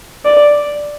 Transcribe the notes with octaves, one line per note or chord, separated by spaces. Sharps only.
D5